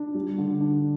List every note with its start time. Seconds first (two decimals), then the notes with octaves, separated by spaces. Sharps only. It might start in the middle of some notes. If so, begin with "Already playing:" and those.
Already playing: D4
0.15 G3
0.38 D3
0.60 D4